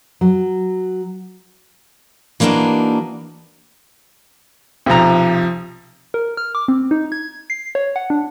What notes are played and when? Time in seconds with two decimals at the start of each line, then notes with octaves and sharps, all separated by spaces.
0.21 F#3
2.40 E3 A#3 B3 D4 D#4 F#4
4.86 B1 C3 F3 A#5
6.14 A#4
6.37 F6
6.55 D6
6.68 C4
6.91 D#4
7.12 G#6
7.50 C7
7.75 C#5
7.96 F#5
8.10 D4